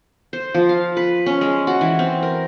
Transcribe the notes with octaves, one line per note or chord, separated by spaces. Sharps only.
C5
F3
F5
B4
C#4
G#3
F#4
E3
C4
A#4